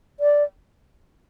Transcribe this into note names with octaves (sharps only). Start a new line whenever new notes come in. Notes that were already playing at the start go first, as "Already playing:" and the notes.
D5